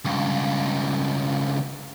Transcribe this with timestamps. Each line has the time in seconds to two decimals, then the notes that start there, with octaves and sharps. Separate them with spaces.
0.05 C#2 G2